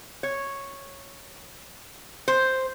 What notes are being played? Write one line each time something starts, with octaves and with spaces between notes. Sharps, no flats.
C#5
C5